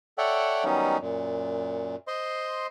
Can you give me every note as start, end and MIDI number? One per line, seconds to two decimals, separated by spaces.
0.18 0.64 69
0.18 0.64 73
0.18 0.64 74
0.18 0.64 76
0.18 0.64 78
0.18 0.64 79
0.64 0.97 51
0.64 0.97 54
0.64 0.97 55
0.64 0.97 59
0.64 0.97 61
0.64 0.97 63
1.01 1.96 42
1.01 1.96 46
2.07 2.67 72
2.07 2.67 75
2.07 2.67 84